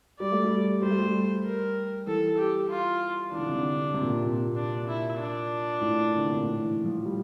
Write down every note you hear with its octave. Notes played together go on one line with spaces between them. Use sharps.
G3 D5
A3
G3
G3 C5
A3
G3
A#4
E3 A4
G4
F4
E3 D4
D3
C3
D3
C3
A#2
C3
A#2
D4
E4
D4
A2
D3
C3
A#2
A2
E3
F3
G3